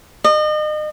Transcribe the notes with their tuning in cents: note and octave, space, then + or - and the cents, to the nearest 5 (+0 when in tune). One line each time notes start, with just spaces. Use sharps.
D#5 -35